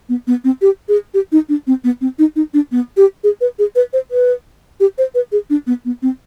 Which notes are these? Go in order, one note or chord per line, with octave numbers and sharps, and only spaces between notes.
B3
B3
C4
G4
G#4
G4
D#4
D4
C4
B3
C4
D#4
D#4
D4
B3
G4
G#4
B4
G#4
B4
C5
B4
G4
C5
B4
G#4
D4
B3
B3
C4